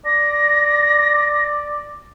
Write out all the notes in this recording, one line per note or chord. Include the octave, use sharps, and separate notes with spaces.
D5 A#6